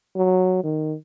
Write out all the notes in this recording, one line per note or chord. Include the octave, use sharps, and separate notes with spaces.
F#3
D#3